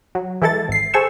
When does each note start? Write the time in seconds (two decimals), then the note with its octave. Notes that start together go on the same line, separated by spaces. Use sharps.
0.15 F#3
0.42 E3 G#3 E4 A4 A6
0.68 G#1 C7
0.94 G#4 A4 C5 C#6 E6